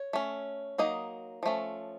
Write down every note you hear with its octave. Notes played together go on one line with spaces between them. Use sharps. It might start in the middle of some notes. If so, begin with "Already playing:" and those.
Already playing: C#5
A3 C#4
F#3 A#3 D#4 D#5
F3 A3 C#4